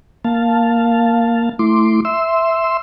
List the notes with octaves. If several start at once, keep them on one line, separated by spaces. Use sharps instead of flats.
A#3 F5 A5
A3 E4 C6 D6
E5 C6 E6